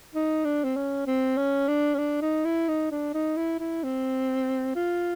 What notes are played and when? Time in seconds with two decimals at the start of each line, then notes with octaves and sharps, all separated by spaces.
0.15 D#4
0.45 D4
0.64 C4
0.76 C#4
1.07 C4
1.37 C#4
1.68 D4
1.94 C#4
1.98 D4
2.22 D#4
2.45 E4
2.69 D#4
2.91 D4
3.14 D#4
3.37 E4
3.60 E4
3.84 C4
4.76 F4